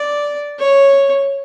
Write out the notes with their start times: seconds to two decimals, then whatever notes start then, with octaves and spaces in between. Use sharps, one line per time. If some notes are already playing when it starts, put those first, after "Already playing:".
Already playing: D5
0.58 C#5